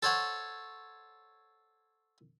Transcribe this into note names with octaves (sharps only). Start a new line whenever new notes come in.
A4 C5 C#5 F#5